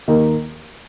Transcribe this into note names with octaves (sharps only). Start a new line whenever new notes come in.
D#2 D#3 A#3 D#4